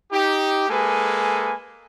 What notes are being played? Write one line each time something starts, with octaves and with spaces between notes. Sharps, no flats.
D#4 G4
G#3 A#3 A4 B4 G#5